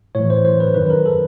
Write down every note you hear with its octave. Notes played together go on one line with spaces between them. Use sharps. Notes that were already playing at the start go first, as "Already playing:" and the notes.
A2 E3 C#5
C5
C5
B4
F#2 D#3 B4
A#4
A4